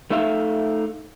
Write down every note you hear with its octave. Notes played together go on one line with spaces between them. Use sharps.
A3 D#4 A4 E5 F5